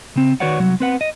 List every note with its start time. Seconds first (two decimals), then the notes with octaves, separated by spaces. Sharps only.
0.16 C#3 C4
0.40 D#3 F#4 B4 C#5 D5 F#5
0.60 C2 F#3 F#4
0.80 C4 B4 F#5
1.01 D#5